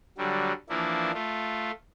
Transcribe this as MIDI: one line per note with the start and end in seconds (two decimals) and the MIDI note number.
0.18 0.52 50
0.18 0.52 54
0.18 0.52 55
0.69 1.11 52
0.69 1.11 53
0.69 1.11 58
0.69 1.11 62
0.69 1.11 64
1.14 1.71 57
1.14 1.71 65